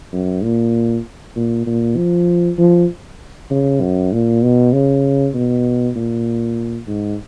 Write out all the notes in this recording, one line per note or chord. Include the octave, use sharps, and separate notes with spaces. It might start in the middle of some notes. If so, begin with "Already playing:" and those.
F#2
A#2
A#2
A#2
F3
F3
C#3
F#2
A#2
B2
C#3
B2
A#2
G#2